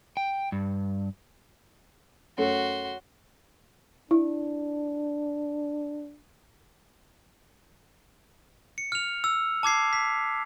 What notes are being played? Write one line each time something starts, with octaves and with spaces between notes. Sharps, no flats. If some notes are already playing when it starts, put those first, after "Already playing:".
G5
G2
F#2 A3 F#4 C#5 C6
D4 E4
C#7
F6 F7
E6
A5 D6 G#6 C7
B6